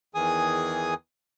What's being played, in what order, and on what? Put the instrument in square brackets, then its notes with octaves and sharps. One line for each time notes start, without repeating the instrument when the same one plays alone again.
[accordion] E2 D#3 E3 G#4 G#5 D#6